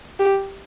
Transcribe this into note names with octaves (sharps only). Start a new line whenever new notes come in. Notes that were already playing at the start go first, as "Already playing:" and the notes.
G4